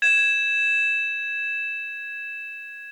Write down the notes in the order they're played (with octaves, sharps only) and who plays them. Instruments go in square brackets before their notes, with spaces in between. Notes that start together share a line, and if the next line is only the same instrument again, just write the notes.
[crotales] G#6 E7